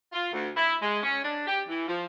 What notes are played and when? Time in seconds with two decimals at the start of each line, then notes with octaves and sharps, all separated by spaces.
0.13 F4
0.32 D2
0.57 E4
0.82 G#3
1.03 C#4
1.24 D4
1.47 G4
1.68 E3
1.88 F3